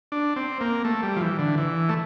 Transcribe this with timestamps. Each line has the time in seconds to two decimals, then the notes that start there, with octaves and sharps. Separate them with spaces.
0.12 D4
0.36 C4
0.61 A#3
0.85 A3
1.03 G3
1.17 F3
1.21 E3
1.39 D3
1.58 E3
1.89 A3